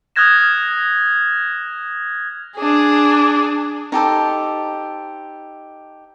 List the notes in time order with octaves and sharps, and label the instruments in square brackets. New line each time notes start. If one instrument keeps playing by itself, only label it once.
[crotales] D#6 F6 F#6 G#6 A#6 E7
[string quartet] D4 G#4
[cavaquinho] D#4 G4 A4 C5